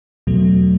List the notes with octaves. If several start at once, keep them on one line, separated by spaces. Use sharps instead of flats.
E2 B2 F#3 A3